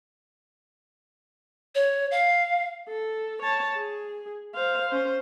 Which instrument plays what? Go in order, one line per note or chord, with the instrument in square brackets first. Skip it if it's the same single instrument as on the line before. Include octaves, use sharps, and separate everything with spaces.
[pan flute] C#5
F5
[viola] A4
C#5 A5
G#4
C5 F5
C#4 C5